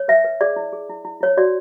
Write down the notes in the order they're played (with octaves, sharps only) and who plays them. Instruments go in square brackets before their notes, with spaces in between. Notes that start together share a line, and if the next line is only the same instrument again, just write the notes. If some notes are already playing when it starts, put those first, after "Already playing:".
Already playing: [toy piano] C#5
B4 E5
B4
G#4 D5
E4
G#4
E4
E4
E4 C#5
F#4 D5